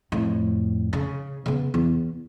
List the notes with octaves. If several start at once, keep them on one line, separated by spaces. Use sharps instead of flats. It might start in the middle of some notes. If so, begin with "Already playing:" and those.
F2 A2
C#3
C#3 B3
E2